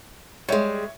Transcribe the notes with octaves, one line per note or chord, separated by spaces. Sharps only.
G3 G#3 C#5 E5